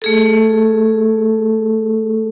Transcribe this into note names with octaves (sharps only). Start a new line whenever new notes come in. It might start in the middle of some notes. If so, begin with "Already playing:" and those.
A3 G#4 A4